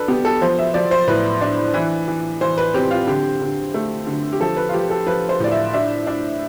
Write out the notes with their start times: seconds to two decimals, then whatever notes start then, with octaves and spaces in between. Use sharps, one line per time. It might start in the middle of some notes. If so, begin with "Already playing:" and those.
Already playing: D4 A4 B4
0.08 B3 G4
0.25 A4
0.41 F3 C5
0.58 E5
0.74 F3 D5
0.91 C5
1.07 A2 B4
1.41 D4
1.74 E3
2.08 E3
2.41 E3 C5
2.58 B4
2.74 C4 G4
2.91 F4
3.07 D3 G4
3.41 D3
3.74 A3
4.07 D3
4.33 G4
4.40 F3 A4
4.57 B4
4.69 F4
4.73 F3 G4
4.90 A4
5.07 F3 B4
5.29 C5
5.40 A2 D5
5.51 E5
5.73 D4 E5
6.07 D4